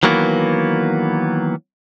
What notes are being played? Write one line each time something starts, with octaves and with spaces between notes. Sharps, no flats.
D#3 E3 F#3 A#3 B3